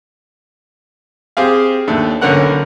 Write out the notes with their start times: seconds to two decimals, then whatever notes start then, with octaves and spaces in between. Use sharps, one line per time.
1.37 C4 G4 G#4 F5
1.87 D#2 A3 D4
2.21 B1 D3 C#4 A#4 F#5 F#6